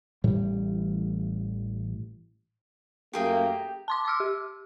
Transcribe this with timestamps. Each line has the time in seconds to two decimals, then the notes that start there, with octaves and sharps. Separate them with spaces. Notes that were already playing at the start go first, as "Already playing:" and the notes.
0.24 A1 A2 E3 G3
3.13 F#2 A3 A#3 G4 G#4 G5
3.88 A5 C6 D6
4.05 C6 D6 E6 F6
4.20 G4